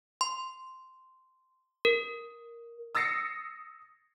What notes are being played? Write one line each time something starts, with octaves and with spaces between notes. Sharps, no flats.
C6
A#4
D#6 E6 A6 A#6 C7 C#7